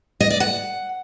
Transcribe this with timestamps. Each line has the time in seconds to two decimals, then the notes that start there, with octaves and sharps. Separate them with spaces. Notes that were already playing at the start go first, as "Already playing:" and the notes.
0.21 D#5
0.30 D5
0.40 F#5